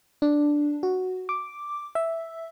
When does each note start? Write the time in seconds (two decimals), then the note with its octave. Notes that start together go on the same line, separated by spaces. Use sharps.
0.22 D4
0.83 F#4
1.29 D6
1.95 E5